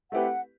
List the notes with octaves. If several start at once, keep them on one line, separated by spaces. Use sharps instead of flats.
A3 C4 E4 G4 B4 F#5